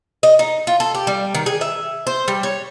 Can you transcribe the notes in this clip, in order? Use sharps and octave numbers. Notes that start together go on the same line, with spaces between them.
D#5
D#4
F4
A4
G4
G3
D#3
G#4
E5
C5
G3
C#5